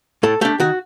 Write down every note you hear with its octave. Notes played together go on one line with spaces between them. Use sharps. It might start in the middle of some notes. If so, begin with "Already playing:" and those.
A2 A4
A3 D4 G4
D#3 F#4